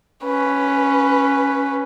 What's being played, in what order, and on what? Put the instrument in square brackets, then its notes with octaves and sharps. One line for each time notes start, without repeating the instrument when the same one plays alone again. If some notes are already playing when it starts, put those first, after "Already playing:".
[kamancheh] C#4 B4